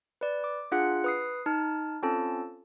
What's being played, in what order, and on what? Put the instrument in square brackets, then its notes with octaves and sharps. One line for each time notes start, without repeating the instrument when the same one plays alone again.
[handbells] B4 D5
D6
D4 F4 G#4 F#5 F#6 C#7
B4 D#6 C7
D#4 A5 F6
C4 C#4 F4 A4 A5